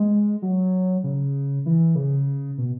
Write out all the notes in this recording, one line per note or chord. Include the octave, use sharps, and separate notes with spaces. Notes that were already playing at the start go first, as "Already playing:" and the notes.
Already playing: G#3
F#3
C#3
E3
C#3
B2